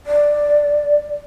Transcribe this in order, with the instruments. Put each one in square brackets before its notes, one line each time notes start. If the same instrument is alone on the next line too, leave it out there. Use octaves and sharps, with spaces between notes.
[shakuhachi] D5